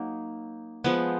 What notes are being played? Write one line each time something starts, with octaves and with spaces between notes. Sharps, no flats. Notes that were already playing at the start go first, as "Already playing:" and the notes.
Already playing: F#3 A#3 D#4
F3 G#3 B3